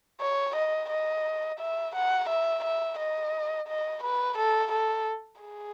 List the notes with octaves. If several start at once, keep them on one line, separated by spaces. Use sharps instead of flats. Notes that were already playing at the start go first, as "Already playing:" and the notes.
C#5
D#5
D#5
E5
F#5
E5
E5
D#5
D#5
B4
A4
A4
G#4